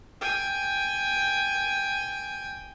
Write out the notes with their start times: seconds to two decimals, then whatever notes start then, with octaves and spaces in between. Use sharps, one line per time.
0.21 G5 G#5